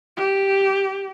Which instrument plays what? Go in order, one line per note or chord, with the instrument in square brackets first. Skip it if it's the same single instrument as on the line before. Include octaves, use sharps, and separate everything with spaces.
[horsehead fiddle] G4